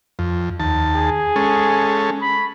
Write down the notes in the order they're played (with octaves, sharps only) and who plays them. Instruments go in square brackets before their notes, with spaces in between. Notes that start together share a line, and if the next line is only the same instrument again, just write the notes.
[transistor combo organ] F2
D#2 A5
[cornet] G#4
[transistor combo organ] G#3 C#4 A4
[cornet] B5